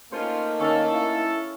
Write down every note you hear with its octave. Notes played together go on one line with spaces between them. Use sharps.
A3 A#3 C#4 D#4 F4 C5
D#3 C#4 A4 F5
E4